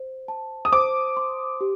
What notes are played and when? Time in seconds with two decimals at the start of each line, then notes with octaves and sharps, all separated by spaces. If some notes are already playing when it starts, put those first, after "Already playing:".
Already playing: C5
0.28 A5
0.65 D#6
0.72 C5 D6
1.17 C6
1.61 G4